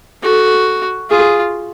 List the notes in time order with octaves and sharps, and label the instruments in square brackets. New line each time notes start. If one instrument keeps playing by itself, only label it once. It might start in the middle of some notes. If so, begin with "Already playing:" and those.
[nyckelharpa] F#4 [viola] A4
[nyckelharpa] F4 [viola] G#4